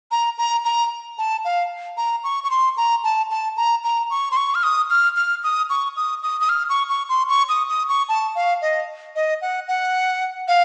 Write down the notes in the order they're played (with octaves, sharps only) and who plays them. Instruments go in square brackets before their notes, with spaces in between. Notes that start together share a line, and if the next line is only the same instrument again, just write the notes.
[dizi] A#5
A#5
A#5
A5
F5
A#5
C#6
C#6
C6
A#5
A5
A5
A#5
A#5
C#6
C6
C#6
F6
D#6
F6
F6
D#6
C#6
D#6
D#6
D#6
F6
C#6
C#6
C6
C#6
D#6
D#6
C#6
A5
F5
D#5
D#5
F#5
F#5
F5